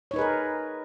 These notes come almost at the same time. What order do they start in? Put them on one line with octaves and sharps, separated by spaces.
C#5 D#4 B4 G#4 A#4